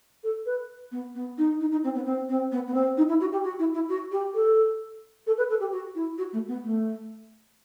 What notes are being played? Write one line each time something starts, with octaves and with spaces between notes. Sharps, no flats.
A4
B4
B3
B3
D#4
D#4
D#4
C4
B3
C4
C4
B3
B3
C4
D#4
E4
F#4
G4
F#4
E4
E4
F#4
G4
A4
A4
B4
A4
G4
F#4
E4
F#4
A3
B3
A3